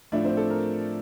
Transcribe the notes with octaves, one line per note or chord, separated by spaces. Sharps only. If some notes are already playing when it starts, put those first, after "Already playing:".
A2 F3 A3 D4 D5
C4 C5
A4
A#4